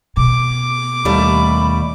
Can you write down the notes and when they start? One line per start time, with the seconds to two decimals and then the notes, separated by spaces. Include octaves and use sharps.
0.17 B2 D6
1.05 D#2 G3 A3 B5